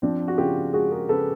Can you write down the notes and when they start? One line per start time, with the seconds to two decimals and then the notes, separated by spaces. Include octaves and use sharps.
0.02 F3 C4 D4
0.28 F#4
0.38 C#3 F4 G4
0.73 G#3 F#4 G#4
0.91 G#4 A#4
1.09 C#3 A4 B4